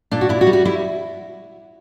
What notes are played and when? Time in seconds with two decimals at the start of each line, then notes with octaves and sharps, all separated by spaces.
0.11 A#2 D4
0.21 F#4
0.29 A#2 E4
0.41 F#4
0.47 G3
0.53 F#4
0.65 G3 E4